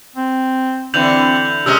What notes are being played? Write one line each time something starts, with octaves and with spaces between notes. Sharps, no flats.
C4
D3 E3 C4 G6 F7 F#7
C3 G#3 C#4 A#4 E6